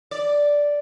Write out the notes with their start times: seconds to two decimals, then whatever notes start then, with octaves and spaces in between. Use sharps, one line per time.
0.11 D5